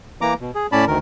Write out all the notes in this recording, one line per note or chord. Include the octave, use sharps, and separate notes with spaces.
E3 A#3 A#5 D6
B2
G#4
A2 C#4 D5 A5 B5
D2 D#3 A#4